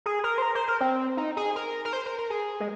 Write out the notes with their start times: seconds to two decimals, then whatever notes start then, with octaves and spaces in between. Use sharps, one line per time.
0.06 G#4
0.24 A#4
0.38 C5
0.42 A#4
0.55 C5
0.68 A#4
0.80 C4
1.17 D#4
1.37 G#4
1.56 A#4
1.85 A#4
1.93 C5
2.06 A#4
2.18 A#4
2.30 G#4
2.60 G#3